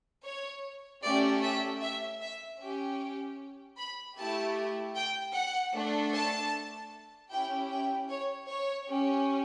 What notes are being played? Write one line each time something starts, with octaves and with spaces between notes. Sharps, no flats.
C#5
A3 C#4 G4 D5
E5
E5
E5
C#4 G4
B5
A3 E4 G4 A5
G5
F#5
A3 D4 A4
A5
C#4 E4 G4 G5
G5
C#5
C#5
C#4 G4